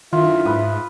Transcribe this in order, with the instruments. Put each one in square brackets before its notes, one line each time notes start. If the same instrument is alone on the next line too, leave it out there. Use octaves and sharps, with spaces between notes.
[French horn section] F#2 D3 E4 [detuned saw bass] D#3 [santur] F4 [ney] E5
[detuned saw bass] G#2 [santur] B4 D#6